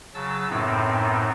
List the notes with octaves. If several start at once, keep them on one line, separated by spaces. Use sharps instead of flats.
C#3 F#3 A5 E6
F#2 A2 B3 C4 D#4